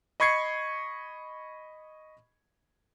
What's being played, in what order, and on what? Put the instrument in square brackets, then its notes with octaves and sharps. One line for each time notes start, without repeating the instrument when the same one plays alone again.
[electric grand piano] D#5 B5 C#6 G#6 C7 C#7